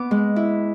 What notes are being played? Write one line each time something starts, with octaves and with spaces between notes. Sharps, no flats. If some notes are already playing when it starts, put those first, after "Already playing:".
Already playing: B3 D6
G#3
E4